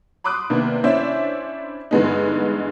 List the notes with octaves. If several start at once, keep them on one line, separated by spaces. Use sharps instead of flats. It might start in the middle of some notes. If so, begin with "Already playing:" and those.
B5 C6 D6 D#6 F#6
C3 D#3 A#3 B3 D4
C#4 D4 E4 C5 D5 E5
G2 D3 E3 G#3 B3 D#4